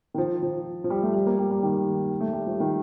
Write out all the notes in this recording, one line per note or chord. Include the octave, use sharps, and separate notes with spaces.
D#3
F3
F3
F3
G3
A3
G3
A#3
G3
G3
D#3
A3
G3
F3
D#3